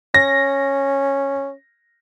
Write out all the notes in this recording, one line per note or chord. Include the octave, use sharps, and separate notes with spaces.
C#4 A#6